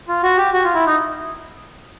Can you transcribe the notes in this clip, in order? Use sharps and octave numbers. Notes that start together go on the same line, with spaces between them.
F4
F#4
G4
F#4
F4
E4
D#4